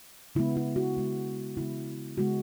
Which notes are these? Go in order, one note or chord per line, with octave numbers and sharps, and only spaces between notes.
C#3 G#3 B3 E4
E4
F#4
C#3 G#3 B3
C#3 G#3 B3 E4
C#3 G#3 B3 F#4